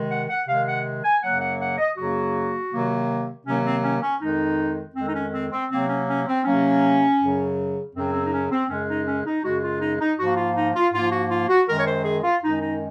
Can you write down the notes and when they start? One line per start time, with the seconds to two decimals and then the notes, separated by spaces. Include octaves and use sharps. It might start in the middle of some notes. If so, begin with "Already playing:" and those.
Already playing: C3 D#3 G#3
0.11 F#5
0.30 F#5
0.48 C3 D#3 G#3 F5
0.67 F#5
1.04 G#5
1.23 F#2 C#3 F#3 A#3 F#5
1.41 F#5
1.61 F#5
1.78 D#5
1.97 F#2 C#3 F#3 A#3 F#4
2.72 C3 D#3 F#3 A#3
3.46 C3 D#3 F#3 A#3 C#4
3.66 C4
3.84 C#4
4.02 C#4
4.22 F2 D#3 G#3 D#4
4.96 F2 D#3 G#3 C4
5.08 D#4
5.15 C#4
5.33 C4
5.52 C4
5.71 C3 F#3 A#3 C4
5.89 C#4
6.09 C#4
6.28 C4
6.45 C3 F#3 A#3 C#4
7.20 F#2 C#3 F#3
7.95 F#2 C#3 F#3 C4
8.13 C4
8.26 D#4
8.33 C#4
8.52 C4
8.69 F#2 C#3 G#3 C#4
8.89 D#4
9.07 C#4
9.26 D#4
9.44 F#2 C#3 G#3 F#4
9.62 F4
9.81 D#4
10.01 D#4
10.19 G#2 F3 A#3 F#4
10.37 F4
10.57 D#4
10.75 F4
10.93 G#2 F3 A#3 F4
11.12 F#4
11.31 F4
11.49 F#4
11.68 F#2 D#3 G#3 A#4
11.79 C#5
11.86 C5
12.05 G#4
12.24 F4
12.43 F#2 D#3 G#3 D#4
12.62 D#4